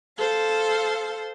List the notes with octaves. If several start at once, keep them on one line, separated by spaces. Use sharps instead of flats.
A4 C5 F5